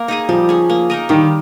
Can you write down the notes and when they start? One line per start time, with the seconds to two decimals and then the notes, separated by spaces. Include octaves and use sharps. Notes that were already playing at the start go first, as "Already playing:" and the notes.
Already playing: A#3 A#4
0.08 D#4 G#4 D#5
0.29 F3 G3
0.49 C#4 G#4
0.70 A#3
0.90 D#4 A#4 D#5
1.09 D#3 G3